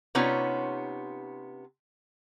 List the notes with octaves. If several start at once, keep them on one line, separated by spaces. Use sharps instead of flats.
C3 B3 C#4 D#4 F4 C#5